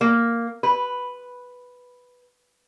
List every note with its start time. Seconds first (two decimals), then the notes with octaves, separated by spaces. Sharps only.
0.01 A#3
0.63 B4